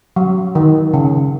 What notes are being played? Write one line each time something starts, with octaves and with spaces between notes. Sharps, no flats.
F#3
D#3
C#3